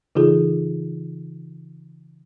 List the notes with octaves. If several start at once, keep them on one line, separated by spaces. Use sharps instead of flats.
C#3 E3 D#4 F4 G#4 A4